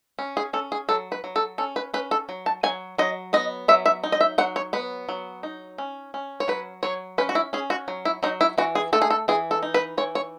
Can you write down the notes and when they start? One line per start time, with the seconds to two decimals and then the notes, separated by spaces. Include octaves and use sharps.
0.19 C#4
0.37 G#4
0.53 C#4 A4
0.72 G#4
0.89 F#3 A4
1.12 B4
1.24 F#3
1.36 A4
1.58 C#4 A4
1.76 B4
1.94 C#4 B4
2.11 A4
2.29 F#3
2.46 A5
2.63 F#3 G#5
2.98 F#3 D#5
3.33 B3 D#5
3.68 F#3 E5
3.86 E5
4.04 D#4
4.12 D#5
4.21 E5
4.38 F#3 F#5
4.56 C#5
4.73 B3 B4
5.09 F#3
5.43 D#4
5.78 C#4
6.14 C#4
6.40 C#5
6.48 F#3 B4
6.83 F#3 C#5
7.18 C#4 B4
7.29 F#4
7.35 E4
7.53 C#4 G#4
7.70 F#4
7.88 F#3
8.05 E4
8.23 F#3 D#4
8.41 E4
8.58 E3 F#4
8.75 G#4
8.93 A3 A4
9.02 G#4
9.10 A4
9.28 E3 G#4
9.51 A4
9.63 D#4
9.74 B4
9.97 E3 C#5
10.15 C#5